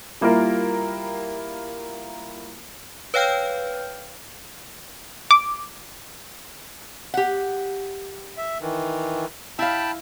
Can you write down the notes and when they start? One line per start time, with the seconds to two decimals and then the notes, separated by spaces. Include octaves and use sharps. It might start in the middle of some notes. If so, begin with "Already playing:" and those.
0.21 G3 A#3 E4 F4 A#4
3.14 B4 C#5 F5 G5 F6 G6
5.31 D6
7.14 G4 F#5
8.38 E5
8.61 D#3 E3
9.59 E4 F5 G5 A5 B5